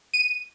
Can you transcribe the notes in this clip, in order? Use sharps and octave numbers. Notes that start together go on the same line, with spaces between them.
D#7